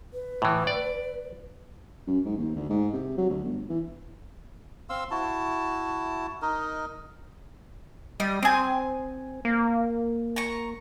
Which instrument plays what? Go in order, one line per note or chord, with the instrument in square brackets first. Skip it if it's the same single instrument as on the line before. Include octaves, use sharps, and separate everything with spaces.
[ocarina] B4
[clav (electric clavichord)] A2 E3
D5
[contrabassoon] F#2
G#2
D#2
D2
G#2
C3
F#3
D2
G1
E3
[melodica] C4 F5 C6 E6
E4 F#4 A5
D#4 A#4 D#5
[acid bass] G3 [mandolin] D#5
[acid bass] C4 [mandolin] G#5 D#6
[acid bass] A#3
[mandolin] A#5 C#6